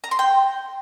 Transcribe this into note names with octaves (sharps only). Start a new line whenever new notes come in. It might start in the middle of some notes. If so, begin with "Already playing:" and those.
A#5
C6
G5